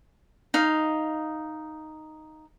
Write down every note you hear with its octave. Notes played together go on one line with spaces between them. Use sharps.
D#4 F5